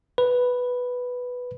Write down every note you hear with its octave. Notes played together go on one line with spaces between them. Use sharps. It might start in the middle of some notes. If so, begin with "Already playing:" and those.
B4